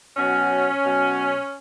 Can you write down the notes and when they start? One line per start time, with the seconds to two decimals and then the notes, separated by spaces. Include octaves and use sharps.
0.17 B2 F#3 C#4
0.84 B2 F#3